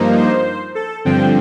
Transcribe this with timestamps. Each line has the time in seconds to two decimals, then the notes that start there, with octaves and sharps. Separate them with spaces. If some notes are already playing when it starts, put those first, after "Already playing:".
Already playing: G2 F3 A#3 D#4
0.17 C5
0.75 A4
1.05 G2 D3 F3 C4 G5